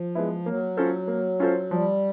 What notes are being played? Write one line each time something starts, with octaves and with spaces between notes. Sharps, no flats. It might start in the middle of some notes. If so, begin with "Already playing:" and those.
Already playing: F3
G#3 B3 E4
F#3 A#3
C#4 F4 A4 C5
A#3
C#4 F4 A4 C5
F3 G3